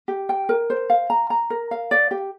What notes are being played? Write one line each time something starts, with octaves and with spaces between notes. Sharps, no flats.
G4
G5
A#4
C5
F5
A#5
A#5
A#4
F5
D5
G4